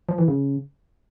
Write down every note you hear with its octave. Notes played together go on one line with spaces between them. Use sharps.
F3
E3
C#3